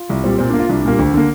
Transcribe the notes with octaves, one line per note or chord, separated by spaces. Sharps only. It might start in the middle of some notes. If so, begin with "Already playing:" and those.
Already playing: F4
C2
A#2 G3 C4
A#2 C4
A#3 D4
F4
C2 D4
A#2 G3 A#3
D2
D3 A#3